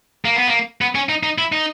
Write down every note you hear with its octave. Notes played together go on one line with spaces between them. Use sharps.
A#3
B3
A#3
B3
C#4
D#4
D#4
E4
D#4